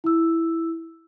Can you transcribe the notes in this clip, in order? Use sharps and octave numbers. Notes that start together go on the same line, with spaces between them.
E4 E6